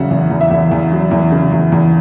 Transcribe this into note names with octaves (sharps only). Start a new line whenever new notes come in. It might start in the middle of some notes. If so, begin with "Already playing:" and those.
Already playing: E2 C#3 F#3 E5 F#5
E2
E2
E5
E2
E2
F#3
E2
C#3
E2
E2